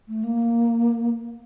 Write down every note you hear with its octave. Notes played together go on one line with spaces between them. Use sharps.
A3
A#3